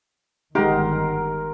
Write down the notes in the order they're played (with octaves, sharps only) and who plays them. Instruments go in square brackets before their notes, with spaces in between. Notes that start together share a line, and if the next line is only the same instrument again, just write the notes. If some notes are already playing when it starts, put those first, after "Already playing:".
[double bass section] G1 D#3 [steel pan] G#3 D#4 [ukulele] G4 [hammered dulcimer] A#4 F#5 C6